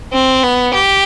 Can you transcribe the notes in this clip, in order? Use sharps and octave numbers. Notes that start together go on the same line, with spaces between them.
C4
B3
G4